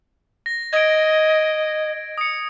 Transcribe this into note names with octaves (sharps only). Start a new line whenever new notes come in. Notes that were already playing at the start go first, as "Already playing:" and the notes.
A#6
D#5 G#6 D7
D#6 C#7